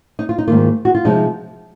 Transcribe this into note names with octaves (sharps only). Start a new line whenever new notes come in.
D#4
F4
D#4
G#2 D#3 A#3 F4
F#4
F4
C3 F3 G#3 D#4